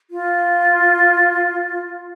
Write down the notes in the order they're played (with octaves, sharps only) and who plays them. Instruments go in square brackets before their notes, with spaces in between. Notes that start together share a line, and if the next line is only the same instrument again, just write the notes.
[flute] F4